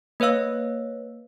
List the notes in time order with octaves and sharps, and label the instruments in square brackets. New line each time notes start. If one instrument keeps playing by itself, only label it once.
[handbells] A#3 B4 C#5 F5 E6